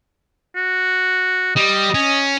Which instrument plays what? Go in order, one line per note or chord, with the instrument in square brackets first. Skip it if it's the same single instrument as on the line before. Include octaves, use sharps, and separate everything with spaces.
[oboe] F#4
[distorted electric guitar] G3 [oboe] D#5
[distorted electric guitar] C#4